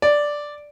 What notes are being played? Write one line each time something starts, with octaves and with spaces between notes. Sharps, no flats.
D5